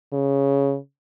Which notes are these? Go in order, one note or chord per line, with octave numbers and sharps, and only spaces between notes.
C#3